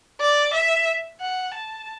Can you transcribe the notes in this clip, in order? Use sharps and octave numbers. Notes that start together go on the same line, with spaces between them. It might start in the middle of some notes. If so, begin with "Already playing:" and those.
D5
E5
F#5
A5